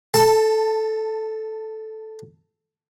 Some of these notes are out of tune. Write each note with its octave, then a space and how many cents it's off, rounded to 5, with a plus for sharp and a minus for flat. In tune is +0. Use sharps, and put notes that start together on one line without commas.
A4 -5 A5 +15